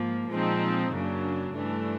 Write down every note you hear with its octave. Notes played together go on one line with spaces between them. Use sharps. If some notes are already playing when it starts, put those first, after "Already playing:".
Already playing: G#2 F3 A#3
A#2 F3 G#3 C4 D#4
F#2 C#3 F#3 A#3 D4
G2 E3 A3 D4